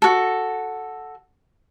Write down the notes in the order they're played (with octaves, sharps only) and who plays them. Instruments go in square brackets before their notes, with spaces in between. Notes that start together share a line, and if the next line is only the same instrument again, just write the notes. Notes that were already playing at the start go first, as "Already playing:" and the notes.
[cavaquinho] F#4 A4